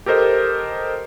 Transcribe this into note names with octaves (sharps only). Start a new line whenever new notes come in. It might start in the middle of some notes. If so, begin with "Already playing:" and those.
G4 A4 A#4 C5 D#5